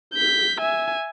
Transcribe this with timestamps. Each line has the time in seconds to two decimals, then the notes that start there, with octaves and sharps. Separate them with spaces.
0.14 G6 B6
0.60 E5 G#5